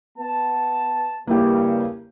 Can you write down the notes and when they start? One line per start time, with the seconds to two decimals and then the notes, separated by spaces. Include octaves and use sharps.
0.18 B3 A5
1.27 G2 C#3 A#3 E4 G4